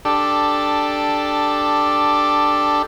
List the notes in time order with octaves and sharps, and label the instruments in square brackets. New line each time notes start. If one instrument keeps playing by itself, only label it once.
[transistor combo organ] D4 G4 A4